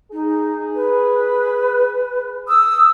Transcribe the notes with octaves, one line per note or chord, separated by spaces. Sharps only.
D#4 G#4
B4
D#6 E6